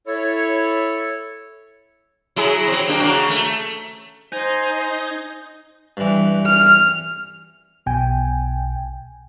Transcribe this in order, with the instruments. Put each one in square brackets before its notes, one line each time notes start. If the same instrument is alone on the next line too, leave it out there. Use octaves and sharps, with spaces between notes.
[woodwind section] E4 A4 C#5
[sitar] F#3 E4 G#4
F#3 C4
A#3 D4 G4
C#3 A#3 F#4
A3
[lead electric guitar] D#4 [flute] C5 [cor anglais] G#5
[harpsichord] G2 E3
[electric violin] F6
[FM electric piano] B1 B2 G5 G#5